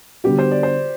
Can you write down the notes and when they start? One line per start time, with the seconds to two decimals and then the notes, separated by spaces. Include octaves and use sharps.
0.24 D3 G3 B3 F#4 G4
0.39 C5
0.51 D5
0.63 C5